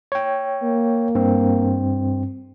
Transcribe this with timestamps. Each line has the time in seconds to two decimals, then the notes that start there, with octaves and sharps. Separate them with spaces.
0.12 C#5 G5
0.63 A#3
1.15 G2 C4